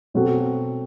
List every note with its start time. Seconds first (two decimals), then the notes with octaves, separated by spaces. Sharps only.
0.14 B2 F#3 C4 F#4 A4